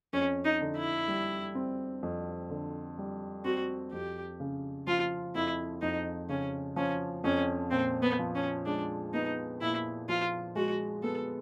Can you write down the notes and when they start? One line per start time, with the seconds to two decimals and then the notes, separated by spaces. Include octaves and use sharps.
0.13 F2 C#4
0.45 D#4
0.61 D3
0.77 E4
1.08 G3
1.55 C4
2.03 F2
2.50 D3
2.98 G3
3.45 C4 F#4
3.92 F2 G4
4.40 C#3
4.87 F3 F4
5.35 F2 E4
5.82 F2 D#4
6.29 C#3 C#4
6.76 F3 C#4
7.24 F2 C#4
7.71 A#2 C4
8.03 B3
8.19 F3
8.35 C#4
8.66 G#3 D4
9.14 B3 D#4
9.61 A#2 E4
10.09 F3 F4
10.56 G#3 F#4
11.03 B3 A4